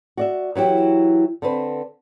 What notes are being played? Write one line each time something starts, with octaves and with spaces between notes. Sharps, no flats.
F#4 D5 E5
E3 F#3 E4 G4
D3 C4 B4